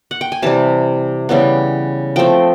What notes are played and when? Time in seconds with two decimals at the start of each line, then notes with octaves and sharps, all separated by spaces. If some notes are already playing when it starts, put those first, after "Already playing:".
0.11 F#5
0.21 G5
0.32 G#5
0.42 C3 E3 G3 A5
1.29 C#3 E3 G3 B3
2.16 F3 A3 C4 G5